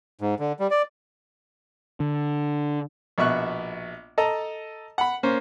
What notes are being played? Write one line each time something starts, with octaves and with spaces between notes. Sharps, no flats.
G#2
D3
G3
D5
D3
A#1 B2 E5 C#6 F#6
A4 D#5 A5 A#5
F#5 B5
A#3 C#4 C5